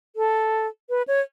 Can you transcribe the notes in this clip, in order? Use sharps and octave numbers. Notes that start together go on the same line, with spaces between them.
A4
B4
C#5